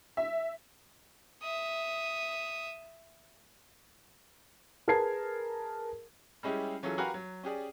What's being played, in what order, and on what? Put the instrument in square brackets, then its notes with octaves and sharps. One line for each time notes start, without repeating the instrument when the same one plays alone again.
[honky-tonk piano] E5
[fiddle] E5 D#6
[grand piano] G#4 A#4 B4 A5 G#6 C7
[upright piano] G3 G#3 C#4 E4 G4 G#4
E3 F#3 C#4 F4 G#4 A4
F#4 G4 A#4 B4 F5 G#5
F#3
C#4 G4 G#4 D5